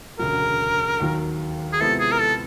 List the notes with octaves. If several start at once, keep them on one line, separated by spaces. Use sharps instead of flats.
E1 D2 C#3 F#3 A#4
D#2 D#3 F#3
G#4
C3 F3 G#3 B3 E4 A4
G#4
A#4
A4